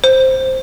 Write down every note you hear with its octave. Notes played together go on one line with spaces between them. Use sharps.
C5